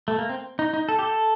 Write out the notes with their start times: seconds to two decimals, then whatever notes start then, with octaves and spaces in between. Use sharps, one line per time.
0.08 A3
0.18 A#3
0.29 C4
0.59 D#4
0.73 D#4
0.89 A4
0.99 G4
1.03 A4